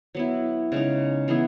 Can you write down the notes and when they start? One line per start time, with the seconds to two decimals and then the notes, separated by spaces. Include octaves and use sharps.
0.15 F#3 B3 E4
0.72 C#3 G#3 D#4
1.28 E3 B3 E4 G#4